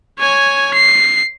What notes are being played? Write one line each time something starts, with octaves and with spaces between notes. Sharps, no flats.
C#5 G#5
C7